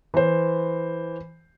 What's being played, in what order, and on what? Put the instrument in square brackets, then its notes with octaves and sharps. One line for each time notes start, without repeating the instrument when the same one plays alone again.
[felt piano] E3 C5